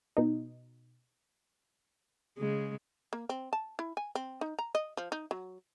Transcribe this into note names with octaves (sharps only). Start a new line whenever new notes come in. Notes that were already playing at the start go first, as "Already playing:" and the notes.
B2 D#4
C#3 G#3
A#3
C4
A5
E4
G#5
C4
D#4
A#5
D#5
F3
D#4
F#3